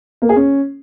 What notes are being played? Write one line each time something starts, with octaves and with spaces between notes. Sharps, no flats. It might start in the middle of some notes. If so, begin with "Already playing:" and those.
A#3
G#4
C#4